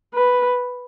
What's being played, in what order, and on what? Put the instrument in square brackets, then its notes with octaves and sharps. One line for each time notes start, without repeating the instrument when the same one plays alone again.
[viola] B4